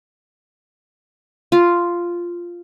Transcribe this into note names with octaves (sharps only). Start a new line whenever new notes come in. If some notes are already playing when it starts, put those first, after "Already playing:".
F4